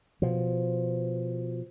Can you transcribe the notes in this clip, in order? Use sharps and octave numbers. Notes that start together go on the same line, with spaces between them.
B2 F3